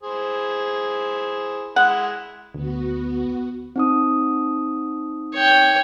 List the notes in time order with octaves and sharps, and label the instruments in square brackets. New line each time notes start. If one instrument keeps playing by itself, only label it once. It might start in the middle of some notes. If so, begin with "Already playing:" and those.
[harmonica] E4 G#4 C5
[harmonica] G#3 E4 [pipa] F#5
[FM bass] D2 [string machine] B3 F#4
[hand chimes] C4 D#4 D#6
[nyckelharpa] C#5 G5